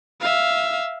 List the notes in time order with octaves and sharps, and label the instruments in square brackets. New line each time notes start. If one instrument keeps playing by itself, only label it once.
[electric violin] E5 F5